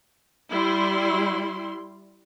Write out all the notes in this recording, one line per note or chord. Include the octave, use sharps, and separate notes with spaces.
G3 E4 C6